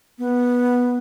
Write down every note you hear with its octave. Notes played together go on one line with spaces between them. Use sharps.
B3